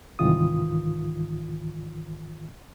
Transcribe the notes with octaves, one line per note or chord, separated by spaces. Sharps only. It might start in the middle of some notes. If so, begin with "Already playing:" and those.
C2 G#2 D#3 E3 F4 D#6